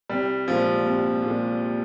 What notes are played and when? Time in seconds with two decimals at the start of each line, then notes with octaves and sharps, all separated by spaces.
0.09 C2 G3
0.48 A#2 F3 G#3
0.85 C2
1.22 A#2 G#3